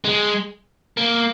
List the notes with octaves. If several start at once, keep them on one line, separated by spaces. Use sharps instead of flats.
G#3
A#3